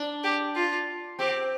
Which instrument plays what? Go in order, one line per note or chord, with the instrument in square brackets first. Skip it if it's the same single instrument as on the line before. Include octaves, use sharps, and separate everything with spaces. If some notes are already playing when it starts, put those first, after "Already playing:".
Already playing: [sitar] D4
[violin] G4
F4
[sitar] C4 [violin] G4